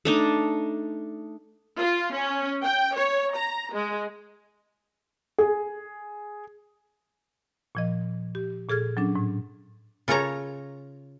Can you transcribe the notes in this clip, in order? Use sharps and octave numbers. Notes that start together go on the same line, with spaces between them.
A3 D4 D#4
F4
C#4
G5
C#5
A#5
G#3
G#4
A#2 F3 D#5
G4
A#2 G#4 A4 F6 G#6
F#3 C#4 D4
A2
C#3 F4 A4 C#5 A#5